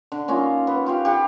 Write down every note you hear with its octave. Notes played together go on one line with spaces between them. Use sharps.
D3
A#3 C#4 D#4 F4
B3
F4 G4 F5
G4 F5 F#5